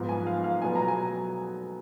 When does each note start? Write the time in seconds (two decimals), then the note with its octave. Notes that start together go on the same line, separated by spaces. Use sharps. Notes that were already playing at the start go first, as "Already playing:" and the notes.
Already playing: G#2 F3 B3
0.09 G#5
0.27 F5
0.44 F5
0.62 B2 F#3 B3 G#5
0.76 A#5
0.88 G#5